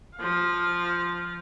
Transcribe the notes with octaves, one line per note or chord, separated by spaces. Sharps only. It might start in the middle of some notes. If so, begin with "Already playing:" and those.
F3 F5